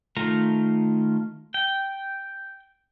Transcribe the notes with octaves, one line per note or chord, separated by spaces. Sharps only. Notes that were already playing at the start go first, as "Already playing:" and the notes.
D#3 A3 F4 A#5
G5